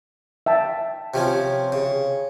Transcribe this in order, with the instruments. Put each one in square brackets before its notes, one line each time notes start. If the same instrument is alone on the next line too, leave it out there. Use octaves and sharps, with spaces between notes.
[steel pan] E5 G5 A5
[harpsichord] C3 F3 C#4
C#3